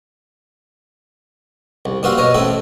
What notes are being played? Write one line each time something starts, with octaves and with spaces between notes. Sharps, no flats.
C2
G2 A#3 F4 F#4 C5 E5
B2 A#4 C#5 D#5
A1 A2 C4 E4 A4